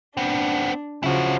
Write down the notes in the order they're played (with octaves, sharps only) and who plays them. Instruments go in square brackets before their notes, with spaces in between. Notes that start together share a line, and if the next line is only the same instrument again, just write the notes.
[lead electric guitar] B3 C4 [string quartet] D4
[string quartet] C#3 F3 F#3 [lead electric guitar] E4 F#4